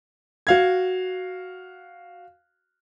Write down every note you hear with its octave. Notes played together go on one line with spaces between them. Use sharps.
F#4 F5 G#6